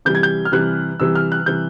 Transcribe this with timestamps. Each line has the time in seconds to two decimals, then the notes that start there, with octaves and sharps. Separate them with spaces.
0.05 C3 E3 G3 G6
0.15 G#6
0.23 G6
0.45 F6
0.52 C3 E3 G3 F#6
1.00 C3 E3 G3 E6
1.15 F6
1.32 F#6
1.46 C3 E3 G3 G6